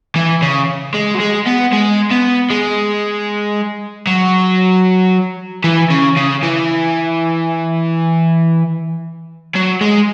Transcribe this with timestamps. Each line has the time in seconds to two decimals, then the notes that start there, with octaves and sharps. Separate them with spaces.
0.16 E3
0.42 C#3
0.94 G#3
1.15 F#3
1.20 G#3
1.47 B3
1.73 G#3
2.11 B3
2.51 G#3
4.07 F#3
5.64 E3
5.90 C#3
6.16 C#3
6.43 E3
9.55 F#3
9.81 G#3